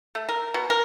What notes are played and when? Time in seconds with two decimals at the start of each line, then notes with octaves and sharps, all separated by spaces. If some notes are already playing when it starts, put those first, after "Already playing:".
0.15 A3
0.29 A#4
0.54 B2
0.70 A#4